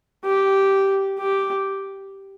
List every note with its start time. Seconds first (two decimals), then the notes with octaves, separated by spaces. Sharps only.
0.24 G4
1.19 G4